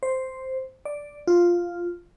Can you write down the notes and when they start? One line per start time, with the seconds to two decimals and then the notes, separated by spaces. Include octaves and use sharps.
0.03 C5
0.85 D5
1.27 F4